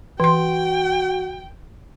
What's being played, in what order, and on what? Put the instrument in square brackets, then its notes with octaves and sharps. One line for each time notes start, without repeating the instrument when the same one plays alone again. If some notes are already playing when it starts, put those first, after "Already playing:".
[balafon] E3 C6 [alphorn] F#4 [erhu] G5